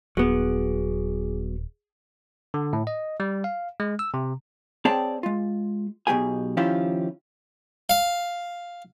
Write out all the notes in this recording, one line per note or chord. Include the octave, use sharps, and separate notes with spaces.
D#1 F#3 B3 G#4
D3
A2
D#5
G3
F5
G#3
E6
C3
C4 G#4 C#5 D5 G5 A5
G#3 F4
B1 B2 A3 G4 G#4 G#5
D#3 F3 C#4 E4 F4 G4
F5